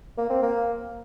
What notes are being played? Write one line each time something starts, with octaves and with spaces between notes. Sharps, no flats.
A#3
C4
A#3